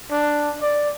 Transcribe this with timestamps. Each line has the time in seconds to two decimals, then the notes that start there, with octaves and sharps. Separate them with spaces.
0.11 D4
0.61 D5